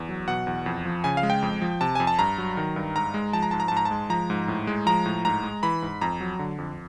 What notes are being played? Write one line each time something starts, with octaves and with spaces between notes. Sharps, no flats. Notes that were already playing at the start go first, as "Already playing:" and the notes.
Already playing: E2
F#3
B2 F#5
E2
F2
F3
C#3 G#5
F5
G#3
G5
F2
F3
C3 A5
F2 G#5
A5
G2 A#5
F#3
D#3
G2
G#2 A#5
G#3
F3 A5
A#5
G#2 A5
A#5
G#2 A5
A#5
A5
G#3
F3 A#5
G#2
A2
G#3
F3 A#5
A2
G#2 A#5
G#3
E3 B5
G#2
F2 A#5
F#3
D3
F2